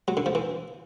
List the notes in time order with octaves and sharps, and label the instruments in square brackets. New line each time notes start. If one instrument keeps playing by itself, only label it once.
[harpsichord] F#3
D3
F3
E3